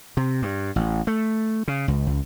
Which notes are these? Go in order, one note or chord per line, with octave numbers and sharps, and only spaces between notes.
C3
G2
A1
A3
C#3
C#2
C#2